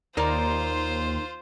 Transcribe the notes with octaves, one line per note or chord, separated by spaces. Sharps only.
D#2 A#3 D#4 F4 A#4 C5 D5 A#5